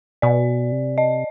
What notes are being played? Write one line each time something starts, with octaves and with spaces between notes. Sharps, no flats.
B2 D5
C3
D#5